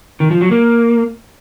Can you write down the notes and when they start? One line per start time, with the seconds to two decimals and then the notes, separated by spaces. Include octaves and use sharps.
0.20 D#3
0.31 F3
0.41 F#3
0.51 A#3